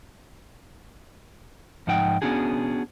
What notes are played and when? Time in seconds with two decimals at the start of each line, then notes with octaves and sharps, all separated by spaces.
1.87 G#2 F3 D#4 F#5 G5
2.22 B3 C#4 D4 F#4 G#4